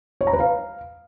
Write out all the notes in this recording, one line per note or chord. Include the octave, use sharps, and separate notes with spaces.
C#5
A#5
B4
F5